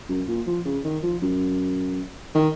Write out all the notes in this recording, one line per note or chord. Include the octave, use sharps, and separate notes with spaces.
F#2
A#2
F3
C#3
D#3
F3
F#2
D#3